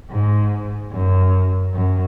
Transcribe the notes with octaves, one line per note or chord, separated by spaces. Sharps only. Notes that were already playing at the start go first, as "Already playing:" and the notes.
G#2
F#2
F#2